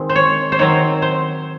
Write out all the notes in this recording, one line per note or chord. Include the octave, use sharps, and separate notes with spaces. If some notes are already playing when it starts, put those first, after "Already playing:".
Already playing: D#3 G#3 C4
C5
C#5
C5
D#3 F#3 C4 C#5
C5